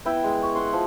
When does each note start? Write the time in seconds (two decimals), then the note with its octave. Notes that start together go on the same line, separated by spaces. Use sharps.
0.05 B3 E4 B4 G5
0.24 G#3
0.42 C#6
0.55 F#5 C6
0.73 F3